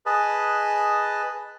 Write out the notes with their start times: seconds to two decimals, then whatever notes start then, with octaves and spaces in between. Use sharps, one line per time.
0.06 G#4 B4 D#5 A5